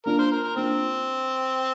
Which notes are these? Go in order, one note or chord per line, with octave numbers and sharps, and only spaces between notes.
A#3 D4 F4 A#4
C5
A#4
A#4
A#3 C4 D4 F4